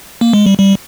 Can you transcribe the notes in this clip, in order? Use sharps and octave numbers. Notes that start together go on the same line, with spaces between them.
A#3
G#3
G3
G3